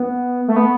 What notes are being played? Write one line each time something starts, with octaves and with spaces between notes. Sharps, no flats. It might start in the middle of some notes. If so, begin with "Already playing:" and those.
Already playing: B3
A3
B3